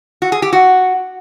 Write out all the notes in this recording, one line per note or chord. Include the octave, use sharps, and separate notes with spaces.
F#4
G#4
G4
F#4